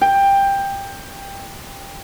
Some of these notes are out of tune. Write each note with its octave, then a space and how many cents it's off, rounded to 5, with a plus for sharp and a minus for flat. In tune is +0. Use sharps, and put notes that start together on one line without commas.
G5 +15